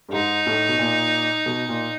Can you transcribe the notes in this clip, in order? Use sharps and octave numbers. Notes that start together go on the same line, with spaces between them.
G2
G#2 D#4
A2
B2
A#2
B2
A#2